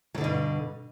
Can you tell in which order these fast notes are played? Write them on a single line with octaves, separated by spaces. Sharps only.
F#3 D3 B2 G2